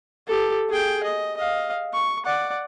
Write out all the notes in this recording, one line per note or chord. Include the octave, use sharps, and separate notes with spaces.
G4 A4
G#4 G5
D#5
D#5 F5
C#6
D5 F#5